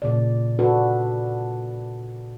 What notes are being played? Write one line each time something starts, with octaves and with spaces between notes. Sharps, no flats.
A#2 C#3 D5
D4 F#4 A4 B4